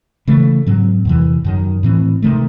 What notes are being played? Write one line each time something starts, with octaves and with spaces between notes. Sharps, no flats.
C#3 E3 A3
G#2 F#3 C4
E2 C3 E3
F#2 D#3 F#3
A2 E3 C4
C3 D#3 A3